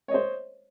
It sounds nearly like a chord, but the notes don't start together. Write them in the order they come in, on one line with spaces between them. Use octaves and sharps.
C#5 D#5 C5